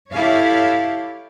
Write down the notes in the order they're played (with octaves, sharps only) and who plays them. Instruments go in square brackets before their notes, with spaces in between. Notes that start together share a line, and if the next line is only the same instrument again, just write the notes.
[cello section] E4 G4 A4 C#5 F5